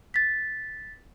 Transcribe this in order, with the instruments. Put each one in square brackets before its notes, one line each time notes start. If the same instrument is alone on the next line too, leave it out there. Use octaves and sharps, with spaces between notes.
[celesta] A6 B6